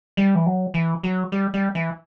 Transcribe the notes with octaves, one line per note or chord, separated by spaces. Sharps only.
G3
E3
F#3
E3
F#3
G3
G3
E3